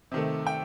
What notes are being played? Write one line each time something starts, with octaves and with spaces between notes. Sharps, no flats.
C3 D#3 A3
G5